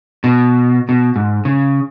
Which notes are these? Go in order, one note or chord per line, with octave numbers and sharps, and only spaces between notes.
B2
B2
G#2
C#3